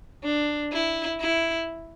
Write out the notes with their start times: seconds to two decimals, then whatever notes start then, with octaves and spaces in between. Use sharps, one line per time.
0.24 D4
0.72 E4
1.21 E4